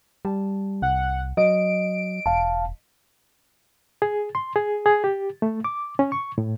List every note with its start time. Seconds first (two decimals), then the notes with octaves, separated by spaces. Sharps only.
0.25 G3 A5
0.82 C2 F#5
1.37 F#3 D#5 D7
2.26 E1 F5 A5
4.02 G#4
4.35 C6
4.56 G#4
4.86 G#4
5.04 G4
5.42 A3
5.64 D6
5.99 C#4
6.12 C#6
6.38 A2